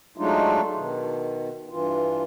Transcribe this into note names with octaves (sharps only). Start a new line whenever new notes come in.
F#3 G#3 A3 D4 D#4 F4
B2 D#3
G2 E3 F4